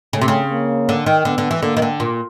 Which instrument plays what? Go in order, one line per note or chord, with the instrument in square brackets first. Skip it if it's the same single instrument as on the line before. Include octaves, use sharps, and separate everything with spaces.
[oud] C#3 [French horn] A3
[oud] C3
C#3
[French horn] A#3
[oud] D3
D#3
[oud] D3 [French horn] B3
[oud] D3
E3
[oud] D3 [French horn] A#3
[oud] D#3
D3
A#2